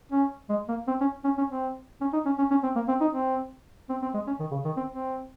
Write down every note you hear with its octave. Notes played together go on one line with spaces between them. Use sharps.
C#4
G#3
A#3
C4
C#4
C#4
C#4
C4
C#4
D#4
C#4
C#4
C#4
C4
A#3
C4
D#4
C4
C4
C4
G#3
C#4
D#3
C#3
D#3
C4
C4